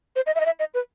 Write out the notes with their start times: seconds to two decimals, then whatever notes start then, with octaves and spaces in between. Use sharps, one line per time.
0.16 C5
0.26 D#5
0.35 E5
0.40 D#5
0.46 E5
0.59 D#5
0.74 B4